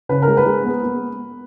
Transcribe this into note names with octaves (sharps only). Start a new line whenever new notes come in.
C#3 B4
A#4
G#3
B4
G#3
B3
B3